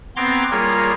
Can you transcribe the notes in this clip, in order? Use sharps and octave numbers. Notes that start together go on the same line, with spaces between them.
B3 C4 A#5 C6 D6 G#6
G3 A#3 F4 G#4 A#4 C#5